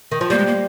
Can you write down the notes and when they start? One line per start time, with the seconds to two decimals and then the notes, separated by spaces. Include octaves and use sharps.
0.11 D#3
0.21 F3
0.30 G3 A#3
0.38 G#3
0.47 A#3